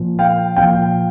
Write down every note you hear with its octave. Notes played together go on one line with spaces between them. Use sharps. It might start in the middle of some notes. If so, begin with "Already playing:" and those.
Already playing: A#2 F3
F5 G5
A#2 F3 F5 G5